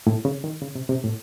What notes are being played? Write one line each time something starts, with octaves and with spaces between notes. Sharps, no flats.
A2
C#3
D#3
C#3
C3
C3
A2